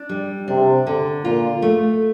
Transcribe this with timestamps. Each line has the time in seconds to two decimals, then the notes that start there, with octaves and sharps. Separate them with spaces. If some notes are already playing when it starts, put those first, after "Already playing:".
Already playing: D4
0.09 G3
0.48 C3 D4
0.87 D3
1.24 A#2 F4
1.62 A3